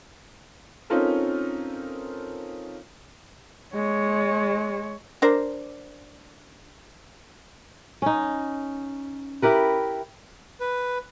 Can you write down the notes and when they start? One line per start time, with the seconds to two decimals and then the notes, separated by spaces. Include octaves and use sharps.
0.90 C4 C#4 D#4 F4 A4 A#4
3.74 G#3 C#5
5.22 D4 A#4 C5
8.02 C#4 D#4
9.42 E4 G4 A#4 B4
10.60 B4